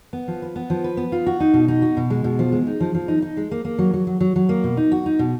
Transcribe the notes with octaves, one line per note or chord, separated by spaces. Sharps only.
B3
F3
B4
B3
F3
B4
B3
F4
F#4
D#4
B2
D#4
F#4
B2
G#3
B2
F3
G#3
D#4
F3
F3
D#4
D#4
G#3
A#3
A#3
F#3
F#3
F#3
F#3
F#3
A#3
B2
D#4
F#4
D#4
B2